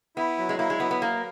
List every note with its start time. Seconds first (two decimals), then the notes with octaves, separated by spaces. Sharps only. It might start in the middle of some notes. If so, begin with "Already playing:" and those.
0.17 B3 E4
0.38 F#3
0.49 G#3
0.59 A#3 E4
0.70 G#3
0.80 F#3 B3
0.91 B3
1.01 A#3 A#4